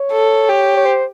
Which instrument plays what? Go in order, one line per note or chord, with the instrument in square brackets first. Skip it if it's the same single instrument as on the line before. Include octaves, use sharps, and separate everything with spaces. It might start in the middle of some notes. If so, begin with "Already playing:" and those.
Already playing: [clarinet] C#5
[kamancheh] A4
G4
[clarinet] C#5
C5